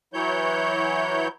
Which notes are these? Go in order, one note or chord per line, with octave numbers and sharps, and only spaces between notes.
E3 F#3 E4 C#5 G6